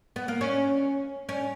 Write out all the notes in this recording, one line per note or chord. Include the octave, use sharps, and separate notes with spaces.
B3
A#3
C#4
C#4